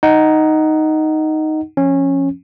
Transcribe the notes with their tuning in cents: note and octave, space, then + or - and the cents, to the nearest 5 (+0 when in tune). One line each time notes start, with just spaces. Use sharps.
D#4 +0 F#5 +20
F3 +0 C#4 -15